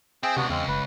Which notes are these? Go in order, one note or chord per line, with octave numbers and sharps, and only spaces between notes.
C4 G#4 E5 G5
C#2 C3 B3 D4 F#4
E2 G#3 C4 F5
F#1 B4